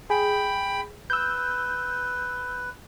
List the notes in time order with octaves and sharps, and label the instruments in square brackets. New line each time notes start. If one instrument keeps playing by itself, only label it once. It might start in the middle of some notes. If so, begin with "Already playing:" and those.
[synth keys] G#4 [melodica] G5 B5
[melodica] B4 [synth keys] E6 G6